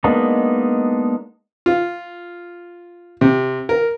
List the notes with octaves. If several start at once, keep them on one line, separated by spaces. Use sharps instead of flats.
G#3 A#3 B3 D4 D#4
F4
C3
A#4